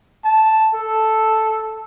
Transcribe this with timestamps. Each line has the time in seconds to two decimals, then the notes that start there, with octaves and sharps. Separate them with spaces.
0.25 A5
0.74 A4